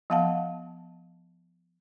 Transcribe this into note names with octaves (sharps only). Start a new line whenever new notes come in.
F3 B3 F5 F#5 A5